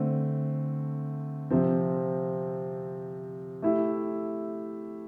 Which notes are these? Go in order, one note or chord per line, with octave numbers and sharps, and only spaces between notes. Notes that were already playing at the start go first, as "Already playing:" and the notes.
Already playing: D3 A3 C4
C3 F3 C4
A3 E4 G4